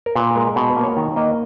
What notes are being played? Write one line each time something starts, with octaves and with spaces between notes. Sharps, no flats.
A#4
A#2 B4
G#3 A#4
B2
B4
A#3
C#5
D#3
A#3 D#5